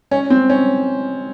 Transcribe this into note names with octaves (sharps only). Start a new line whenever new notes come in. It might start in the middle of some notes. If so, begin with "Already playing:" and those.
C#4
C4
C#4